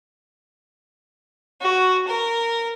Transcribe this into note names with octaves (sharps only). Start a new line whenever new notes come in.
F#4
A#4